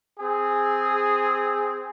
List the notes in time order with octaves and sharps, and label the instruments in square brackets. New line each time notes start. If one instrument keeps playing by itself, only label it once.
[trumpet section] C4 G#4